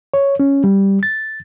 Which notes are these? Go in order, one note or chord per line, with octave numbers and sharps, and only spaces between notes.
C#5
C#4
G3
A6